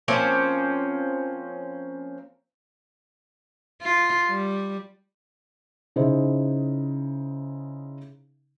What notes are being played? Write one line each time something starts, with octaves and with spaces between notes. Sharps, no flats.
F3 A#3 C4 C#4
F4
G3
C#3 D#4 E4 G#4 C5